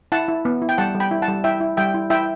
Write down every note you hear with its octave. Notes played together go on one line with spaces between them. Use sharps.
E4 F#5 A5
E4
B3
E4
G5
G3 F#5 A5
G3
G5 B5
E4
F#5 A5
G3
E4 E5 G5
E4
G3 E5 G5
E4
E4 E5 G5